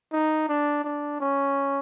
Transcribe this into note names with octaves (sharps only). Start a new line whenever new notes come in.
D#4
D4
D4
C#4